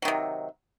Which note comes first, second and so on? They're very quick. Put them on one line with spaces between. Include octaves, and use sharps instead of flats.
F#3 D#3 C3